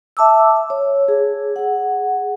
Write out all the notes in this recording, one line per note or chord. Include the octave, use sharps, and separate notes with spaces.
E5 A5 D6 E6
C#5
G#4
G#4 F#5